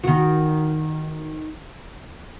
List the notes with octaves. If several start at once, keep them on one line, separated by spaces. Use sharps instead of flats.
D#3 F#4